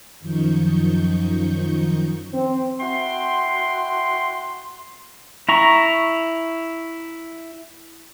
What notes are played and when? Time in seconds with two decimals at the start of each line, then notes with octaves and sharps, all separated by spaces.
0.20 F#2 D#3 F3 D#4 C#6 G6
2.33 C4
2.80 E4 F#4 G5 C6
5.49 E4 A#5 C#6